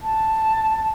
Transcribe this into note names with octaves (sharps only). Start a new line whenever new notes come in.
A5